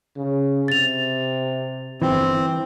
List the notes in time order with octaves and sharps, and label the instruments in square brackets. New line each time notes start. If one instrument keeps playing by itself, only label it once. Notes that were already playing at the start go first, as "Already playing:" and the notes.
[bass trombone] C#3
[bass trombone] C3 [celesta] A6 F7
[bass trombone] G1 [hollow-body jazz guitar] E3 [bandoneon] C4